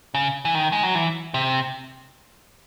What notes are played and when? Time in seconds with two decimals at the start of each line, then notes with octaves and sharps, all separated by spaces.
0.14 C#3
0.45 E3
0.55 D#3
0.72 G#3
0.83 F#3
0.95 E3
1.34 C3